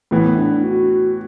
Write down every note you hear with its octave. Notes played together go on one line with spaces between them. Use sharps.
A2 E3 B3 E4
D4
F#4